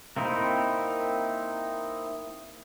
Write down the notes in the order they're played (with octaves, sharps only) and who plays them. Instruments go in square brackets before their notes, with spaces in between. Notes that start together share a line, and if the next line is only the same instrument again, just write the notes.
[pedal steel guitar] A#3 C4 D#4 E4